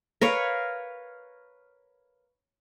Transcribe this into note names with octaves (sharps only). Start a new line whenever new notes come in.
A#4 B4 C#5 F5